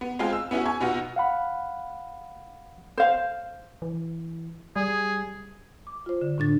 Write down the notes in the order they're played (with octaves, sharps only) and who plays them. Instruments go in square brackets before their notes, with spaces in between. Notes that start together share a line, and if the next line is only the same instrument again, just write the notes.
[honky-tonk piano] B3
G#3 C4 F4 F5 G#5
E6
B3 C#4 E4 F#4 G#4
G#5 C#6
B2 B3 D#4 F4 F#4
[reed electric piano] F5 F#5 B5
[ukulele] C5 F5
[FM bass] E3
[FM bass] G3 [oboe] G#4
[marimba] D6
F4 C5
D3
A2 D3 D4 A6